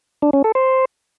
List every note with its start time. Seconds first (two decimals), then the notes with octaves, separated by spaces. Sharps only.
0.22 D4
0.33 C#4
0.44 A4
0.55 C5